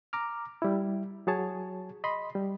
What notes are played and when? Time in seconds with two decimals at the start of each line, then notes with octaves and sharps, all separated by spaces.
0.13 A#5 D6 F6
0.62 G3 E4
1.27 F#3 F#4 G#4 C#5 A5
2.04 D#5 B5 C6
2.35 G3